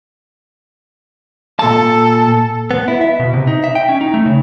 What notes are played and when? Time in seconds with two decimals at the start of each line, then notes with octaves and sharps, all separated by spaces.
1.59 A#2 A4 A5
2.71 B3
2.88 E4
3.01 E5
3.20 B2
3.34 C3
3.47 D#4
3.64 E5
3.75 G5
3.89 C#4
4.01 D#4
4.14 A3
4.26 C#3